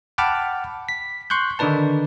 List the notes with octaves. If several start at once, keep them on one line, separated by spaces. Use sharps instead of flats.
F#5 G5 A5 B5 D6 F6
B6
C6 C#6 F#6 G6
D3 D#3 D4 D#4 B4 A5